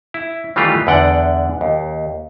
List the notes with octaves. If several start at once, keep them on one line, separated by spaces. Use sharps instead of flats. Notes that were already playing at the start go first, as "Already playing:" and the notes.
E4
D#3 E3 G3 A3 F4 G4
E2 D3 D5 F#5 G5
D#2